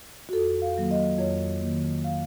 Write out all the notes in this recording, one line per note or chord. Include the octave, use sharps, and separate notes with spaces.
F#4
F2 A4
F5
D#3 F#3 A#3
D#5
F2 C#5
D#3 A#3
F5